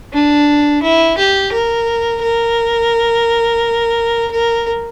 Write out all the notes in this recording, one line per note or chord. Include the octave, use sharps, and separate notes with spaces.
D4
E4
G4
A#4
A#4
A#4